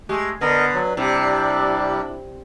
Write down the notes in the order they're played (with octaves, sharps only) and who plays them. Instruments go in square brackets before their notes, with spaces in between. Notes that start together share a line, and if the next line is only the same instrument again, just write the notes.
[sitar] G#3 [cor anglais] A3 [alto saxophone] G4
[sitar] D3 [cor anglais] B3 [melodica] A#4 D#5 [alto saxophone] B4
[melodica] F#3
[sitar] C3 [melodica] G3 [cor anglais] D4 [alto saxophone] E4